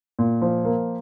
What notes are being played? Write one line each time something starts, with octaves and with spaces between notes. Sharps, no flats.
A#2
F3
A#3